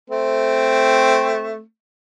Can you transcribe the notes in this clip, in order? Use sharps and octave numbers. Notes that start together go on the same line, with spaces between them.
A3 C4